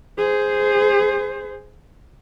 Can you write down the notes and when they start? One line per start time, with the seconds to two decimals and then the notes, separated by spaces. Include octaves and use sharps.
0.18 G#4 C5